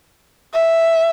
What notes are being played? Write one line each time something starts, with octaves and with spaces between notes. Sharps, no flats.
E5